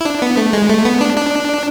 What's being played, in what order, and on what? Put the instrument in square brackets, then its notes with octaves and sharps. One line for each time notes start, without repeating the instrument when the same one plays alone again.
[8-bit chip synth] E4
D4
B3
A3
G#3
A3
B3
D4
D4